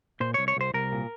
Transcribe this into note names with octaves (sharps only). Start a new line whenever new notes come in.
A#2 C5
C2 C#5
C#5
C2 C5
C2 A#4
A#2